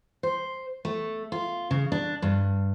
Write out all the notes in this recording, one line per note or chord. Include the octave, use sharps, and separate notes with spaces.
C5
A3
F4
C#3
D4
G2